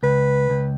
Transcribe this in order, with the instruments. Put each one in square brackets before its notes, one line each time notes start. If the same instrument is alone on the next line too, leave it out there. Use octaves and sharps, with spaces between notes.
[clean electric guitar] C#2 [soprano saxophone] B4
[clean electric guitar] C#2